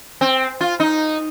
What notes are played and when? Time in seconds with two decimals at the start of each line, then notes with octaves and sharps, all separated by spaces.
0.21 C4
0.61 F4
0.80 D#4